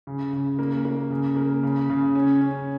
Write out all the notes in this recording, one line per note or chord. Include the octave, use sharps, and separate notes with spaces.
C#3
C#3
A#3
A#3
C#3
A#3
C#3
C#3
C#4
C#4